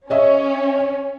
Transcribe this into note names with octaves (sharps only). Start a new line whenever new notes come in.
C#4 C#5 D#5 E5